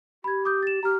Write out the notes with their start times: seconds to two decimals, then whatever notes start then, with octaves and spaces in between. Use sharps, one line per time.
0.24 G4 B5 G#6
0.45 D6 D#6 G6
0.63 A6 E7
0.83 G4 A#5 F6